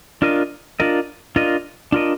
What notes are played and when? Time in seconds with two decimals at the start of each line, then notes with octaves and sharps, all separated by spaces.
0.22 D4 F4 A#4 D#5
0.80 D4 F4 A#4 D#5
1.36 D4 F4 A#4 D#5
1.92 D4 F4 A#4 D#5